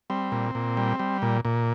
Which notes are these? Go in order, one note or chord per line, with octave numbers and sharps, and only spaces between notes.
G3 C4
A#2
A#2
G3
G3
A#2
A#2